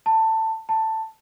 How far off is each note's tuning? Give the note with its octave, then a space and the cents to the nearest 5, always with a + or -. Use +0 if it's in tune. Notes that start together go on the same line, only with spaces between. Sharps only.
A5 +15
A5 +10